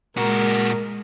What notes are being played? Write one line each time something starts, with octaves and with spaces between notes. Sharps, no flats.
A#2 G#3 F#4 A#4